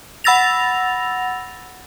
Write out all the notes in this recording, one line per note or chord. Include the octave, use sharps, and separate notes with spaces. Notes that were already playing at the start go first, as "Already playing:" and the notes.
F#5 B5 E6 A6 A#6 F7